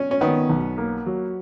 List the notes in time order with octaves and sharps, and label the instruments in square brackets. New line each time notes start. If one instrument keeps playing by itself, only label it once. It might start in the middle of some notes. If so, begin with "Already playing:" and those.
Already playing: [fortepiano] C#4
C#4
[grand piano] D#3 [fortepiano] B3
[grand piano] B1
A#3
F#3